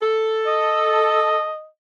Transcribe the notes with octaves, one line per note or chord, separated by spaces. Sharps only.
A4
D#5